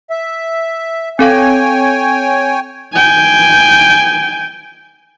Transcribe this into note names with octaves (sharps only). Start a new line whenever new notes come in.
E5
C4 A4 C#5 F5 G5 G#5
G5 G#5